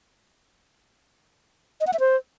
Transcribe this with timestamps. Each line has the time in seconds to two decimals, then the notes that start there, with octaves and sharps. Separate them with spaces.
1.81 D#5
1.87 F#5
1.93 E5
2.00 C5